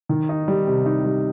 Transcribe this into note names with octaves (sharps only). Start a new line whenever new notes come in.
D#3
D#4
G3
C3
D#4
G3